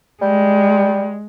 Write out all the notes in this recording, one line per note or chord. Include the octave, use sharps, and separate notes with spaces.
G3 G#3